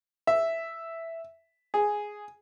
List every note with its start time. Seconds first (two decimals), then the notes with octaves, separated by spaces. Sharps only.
0.27 E5
1.74 G#4